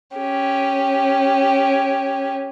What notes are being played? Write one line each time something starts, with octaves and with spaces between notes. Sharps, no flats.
C#4 G4